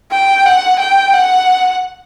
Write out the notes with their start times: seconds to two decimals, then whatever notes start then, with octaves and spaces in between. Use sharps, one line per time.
0.12 G5
0.45 F#5
0.80 G5
1.13 F#5